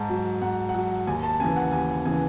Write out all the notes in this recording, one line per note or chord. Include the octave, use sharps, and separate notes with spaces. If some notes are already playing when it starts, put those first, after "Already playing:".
Already playing: G#2 A5
F#3
G#2 F#5
F#5
F#3
D#2 G#5
A5
C#3 E3 G#5
F#5
D#2 G#5
C#3 E3 G#5